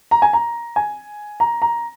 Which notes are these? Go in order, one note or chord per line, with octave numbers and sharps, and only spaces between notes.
A#5
G#5
A#5
G#5
A#5
A#5